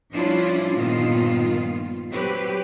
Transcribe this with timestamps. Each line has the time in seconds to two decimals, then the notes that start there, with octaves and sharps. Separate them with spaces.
0.13 F3 G3 C#4 D4 E4 F4
0.76 G2 A#2 D#3 F3 B3 F4
2.11 F#3 C4 G4 B4